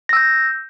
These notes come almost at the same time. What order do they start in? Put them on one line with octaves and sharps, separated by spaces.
A#6 E6 G6